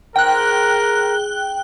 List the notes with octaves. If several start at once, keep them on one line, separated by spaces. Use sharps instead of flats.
G#2 A#4 G5 F#6